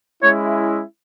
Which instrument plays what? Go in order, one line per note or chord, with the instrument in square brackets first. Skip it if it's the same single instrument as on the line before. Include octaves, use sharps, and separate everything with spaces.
[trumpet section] G#3 C#4 E4 [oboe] C#5